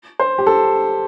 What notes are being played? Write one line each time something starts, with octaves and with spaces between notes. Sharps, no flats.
C5
G4
A4